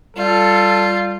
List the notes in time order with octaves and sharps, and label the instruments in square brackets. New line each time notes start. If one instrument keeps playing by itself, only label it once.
[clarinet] G3 [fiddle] F4 [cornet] A4